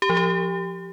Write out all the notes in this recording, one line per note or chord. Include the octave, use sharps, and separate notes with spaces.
G4
F3
G4